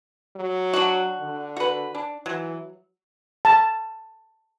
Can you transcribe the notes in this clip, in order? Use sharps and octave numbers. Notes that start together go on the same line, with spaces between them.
F#3
D4 F#4
D3
F#4 B4
D4
E3 F#3
A5